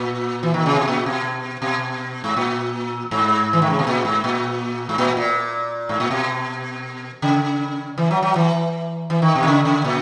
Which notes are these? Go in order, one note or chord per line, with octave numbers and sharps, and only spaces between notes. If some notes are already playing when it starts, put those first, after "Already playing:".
Already playing: A#2
E3
D#3
C#3
B2
A#2
B2
B2
G#2
A#2
G#2
E3
D#3
C#3
B2
A#2
G#2
A#2
G#2
A#2
A#2
G#2
A#2
B2
C#3
E3
F#3
F#3
E3
E3
D#3
B2
D#3
C#3
C#3
A#2